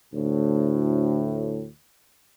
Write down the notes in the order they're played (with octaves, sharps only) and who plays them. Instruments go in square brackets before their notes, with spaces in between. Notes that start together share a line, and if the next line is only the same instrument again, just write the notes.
[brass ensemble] D2 A2